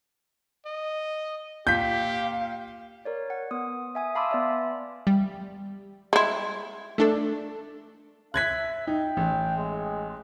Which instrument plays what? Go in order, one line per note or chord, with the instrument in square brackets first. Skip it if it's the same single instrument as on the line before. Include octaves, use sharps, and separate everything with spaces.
[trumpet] D#5
[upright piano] A#2 B6 [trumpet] G4 [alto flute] F5 [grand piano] G6
[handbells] A#4 C#5 D5
F#5
B3 D#6
E5 G#5 D#6
F5 A5 B5 C6 D6 E6
B3 D5 E5
[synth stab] G3
[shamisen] G#3 E4
[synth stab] A3 D4 A4
[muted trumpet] E5 [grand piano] F#6 G#6 B6
[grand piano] D#4 [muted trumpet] G5
[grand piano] A1
[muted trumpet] G#3